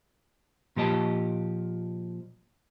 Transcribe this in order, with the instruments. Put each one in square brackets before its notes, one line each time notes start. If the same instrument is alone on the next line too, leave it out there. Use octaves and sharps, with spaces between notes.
[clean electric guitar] A#2 F3 G4 D#5 A5